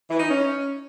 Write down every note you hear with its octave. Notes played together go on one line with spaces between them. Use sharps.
E3
D#4
C#4